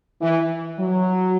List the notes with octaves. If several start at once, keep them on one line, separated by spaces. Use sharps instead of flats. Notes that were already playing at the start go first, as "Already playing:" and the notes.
E3
F#3